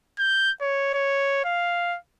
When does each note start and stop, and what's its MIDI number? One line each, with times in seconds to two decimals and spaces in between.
0.19 0.51 91
0.61 0.91 73
0.94 1.41 73
1.45 1.97 77